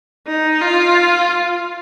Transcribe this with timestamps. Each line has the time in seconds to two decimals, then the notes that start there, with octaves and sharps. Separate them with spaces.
0.27 D#4
0.61 F4